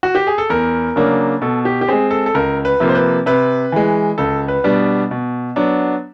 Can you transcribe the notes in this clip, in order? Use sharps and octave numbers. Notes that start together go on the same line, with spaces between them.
F#4
G4
G#4
A4
E2 A#4
C#3 F#3 A#3 D4
B2 A4
G4
G4
G#3 C4 G#4
A4
A4
C#2 A#4
B4
C3 F3 A#3
C5
B4
C3 B4
E3 G#3
C#2 A4
B4
B2 G3 B3 D4
B2
F#3 B3 D4